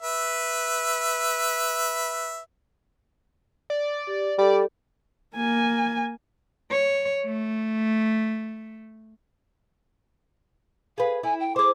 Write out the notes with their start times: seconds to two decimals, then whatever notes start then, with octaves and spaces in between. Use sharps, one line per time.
0.02 B4 E5
3.70 D5
4.07 G4
4.39 G3 G4 A4 D5
5.36 A#3 G#5
6.71 C#5
7.26 A3
10.98 G#4 B4 F5
11.23 E4 G#5
11.40 G5
11.56 G#4 C5 D6